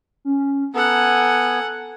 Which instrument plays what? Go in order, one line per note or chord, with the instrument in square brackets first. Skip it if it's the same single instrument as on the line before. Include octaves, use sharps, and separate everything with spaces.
[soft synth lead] C#4
[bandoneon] B3 [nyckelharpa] A4 F#5 [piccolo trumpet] G#5 [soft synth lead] A#5